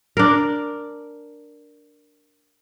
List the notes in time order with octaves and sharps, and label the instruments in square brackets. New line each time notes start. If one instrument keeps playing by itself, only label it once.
[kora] D4 A#4